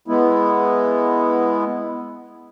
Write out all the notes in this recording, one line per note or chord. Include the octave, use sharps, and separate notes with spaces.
G#3 B3 E4